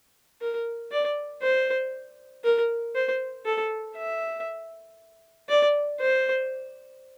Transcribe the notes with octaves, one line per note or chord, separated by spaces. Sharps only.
A#4
D5
C5
A#4
C5
A4
E5
D5
C5